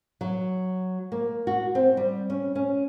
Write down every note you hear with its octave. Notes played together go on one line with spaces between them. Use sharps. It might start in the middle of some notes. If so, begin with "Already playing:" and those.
F#3
A#3
F#4
C4
G3
C#4
C#4